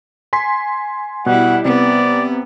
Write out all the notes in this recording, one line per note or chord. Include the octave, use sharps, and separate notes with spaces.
G#5 C6 B6
B2 G3 E4 F#5
C3 B3 D5